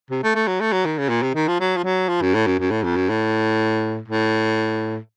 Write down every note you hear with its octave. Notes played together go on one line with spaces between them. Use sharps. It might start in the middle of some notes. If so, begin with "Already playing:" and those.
C3
A3
A3
F#3
A3
F#3
D#3
C#3
A#2
C3
D#3
F3
F#3
F3
F#3
F3
F#2
A2
F#2
F#2
A2
F2
F#2
A2
A2